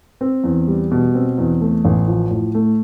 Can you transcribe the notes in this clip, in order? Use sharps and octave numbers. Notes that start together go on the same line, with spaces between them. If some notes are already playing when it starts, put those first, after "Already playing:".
C4
E2
G3
B2
C4
E2
A3
A1
F3
A2
A3